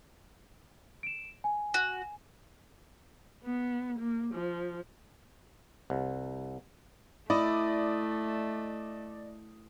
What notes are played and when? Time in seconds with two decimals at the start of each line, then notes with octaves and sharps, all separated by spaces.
1.03 D7 E7
1.44 G#5
1.74 F#4
3.45 B3
3.99 A#3
4.34 F3
5.90 C2
7.30 A3 E4 D5 D#5 D#6